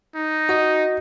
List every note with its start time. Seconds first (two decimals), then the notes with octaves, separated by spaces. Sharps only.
0.15 D#4
0.49 F#4 D#5